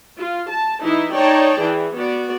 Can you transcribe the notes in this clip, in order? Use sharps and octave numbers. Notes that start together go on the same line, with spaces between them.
F4
A5
E3 D#4 E4
D#4 C#5 D5 G5 A5
E3 G#4
B3 F#4 D5